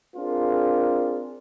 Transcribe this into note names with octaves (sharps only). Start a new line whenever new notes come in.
C4 D4 F4 G#4 A#4